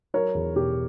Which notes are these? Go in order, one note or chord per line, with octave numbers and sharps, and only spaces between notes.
F#3 A#4 C#5
E2
B2 G4